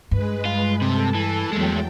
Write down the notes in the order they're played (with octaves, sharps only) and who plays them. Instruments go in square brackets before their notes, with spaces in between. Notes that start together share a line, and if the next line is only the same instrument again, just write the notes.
[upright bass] G2 [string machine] G#3 B4
[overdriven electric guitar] F4
[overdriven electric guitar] C3 [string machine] A4 A5
[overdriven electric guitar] E3
[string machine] E2 F#3 G5 [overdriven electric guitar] G#3 A3